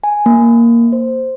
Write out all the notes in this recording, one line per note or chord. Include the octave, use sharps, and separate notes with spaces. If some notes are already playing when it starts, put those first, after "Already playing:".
G#5
A#3
C5